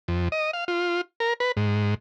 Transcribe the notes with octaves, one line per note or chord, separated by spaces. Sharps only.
F2
D#5
F5
F4
A#4
B4
G#2